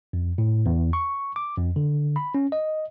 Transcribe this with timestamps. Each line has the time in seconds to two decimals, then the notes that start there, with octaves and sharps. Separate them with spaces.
0.13 F2
0.38 A2
0.66 E2
0.93 C#6
1.36 D6
1.58 F2
1.76 D3
2.16 B5
2.35 C#4
2.52 D#5